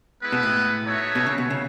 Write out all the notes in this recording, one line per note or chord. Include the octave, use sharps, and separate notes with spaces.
G#3 B3 E4 B4
B2
A2
A3 D#4 F#4 C#5 E5
B2
C#3
B2
C#3